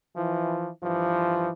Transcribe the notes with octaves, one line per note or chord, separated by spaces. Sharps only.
E3 F3
G2 E3 F3